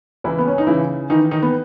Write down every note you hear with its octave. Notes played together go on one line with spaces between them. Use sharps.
C#2 E3 E4
B3
C#4
D#4
C#3 E3 E4
D#3 E3 D#4
D#3 D#4
B3